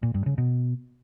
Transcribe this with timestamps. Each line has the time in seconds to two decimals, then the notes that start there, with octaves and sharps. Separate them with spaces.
0.03 A#2
0.14 G2
0.26 C#3
0.38 B2